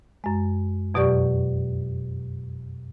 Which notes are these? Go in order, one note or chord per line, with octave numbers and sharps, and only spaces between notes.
F#2 G#3
F2 B2 F#3 G4 D5 C#6